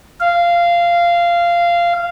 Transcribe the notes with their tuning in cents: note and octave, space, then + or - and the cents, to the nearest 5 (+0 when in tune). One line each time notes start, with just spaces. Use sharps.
F5 -15